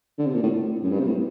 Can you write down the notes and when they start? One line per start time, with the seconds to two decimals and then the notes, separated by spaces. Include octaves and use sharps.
0.19 D3
0.26 C3
0.34 A#2
0.43 A2
0.83 F#2
0.91 G2
0.99 C3
1.07 A2